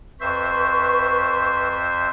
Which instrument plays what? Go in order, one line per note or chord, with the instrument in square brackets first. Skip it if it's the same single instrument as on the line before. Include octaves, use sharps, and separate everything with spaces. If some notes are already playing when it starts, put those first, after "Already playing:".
[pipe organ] F2 C5 E5 [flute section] B4 C#6